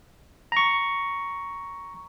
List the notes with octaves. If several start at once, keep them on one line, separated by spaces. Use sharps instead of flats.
A#5 C#6